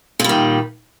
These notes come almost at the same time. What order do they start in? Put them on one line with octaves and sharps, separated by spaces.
A#2 G3 D#3